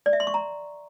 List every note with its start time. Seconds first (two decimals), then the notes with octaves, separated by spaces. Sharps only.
0.06 D5
0.13 E5
0.20 C6
0.27 C#6
0.34 A#5